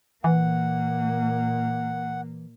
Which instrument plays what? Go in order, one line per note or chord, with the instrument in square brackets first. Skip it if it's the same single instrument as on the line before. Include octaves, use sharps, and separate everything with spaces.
[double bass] A#2 A#3 [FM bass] E3 [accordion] F#5